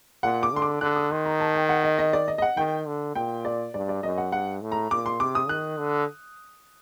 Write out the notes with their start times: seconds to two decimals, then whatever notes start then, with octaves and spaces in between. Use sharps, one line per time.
0.23 A#2 F#5
0.43 D6
0.53 D3 C6
0.62 D6
0.81 D3 F#6
0.96 D#6
1.11 D#3 C6
1.25 A#5
1.40 A5
1.55 G5
1.69 F#5
1.83 D#5
1.98 D#5
2.13 D5
2.28 D#5
2.38 D#5
2.42 F#5
2.57 D#3 G5
2.87 D3
3.15 A#2 G5
3.45 D5
3.74 G2 D5
3.89 D5
4.03 F#2 D#5
4.18 F#5
4.32 G2 F#5
4.61 A2
4.72 A#5
4.91 A#2 D6
5.06 C6
5.20 C3 D6
5.35 D#6
5.49 D#3 F#6
5.78 D3